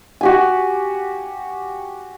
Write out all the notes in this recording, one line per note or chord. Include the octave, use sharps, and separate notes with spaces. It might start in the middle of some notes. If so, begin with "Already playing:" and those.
F#4 G4 G#5